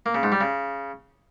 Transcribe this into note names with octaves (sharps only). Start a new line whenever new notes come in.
A#3
C#3
G#2
G3
C#3